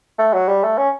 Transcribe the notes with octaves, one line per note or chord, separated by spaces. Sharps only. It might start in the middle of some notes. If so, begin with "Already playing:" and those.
A3
F#3
G3
A3
C#4